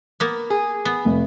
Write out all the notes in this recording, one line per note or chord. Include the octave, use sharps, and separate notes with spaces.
A#3 B3
G#4
B3
F1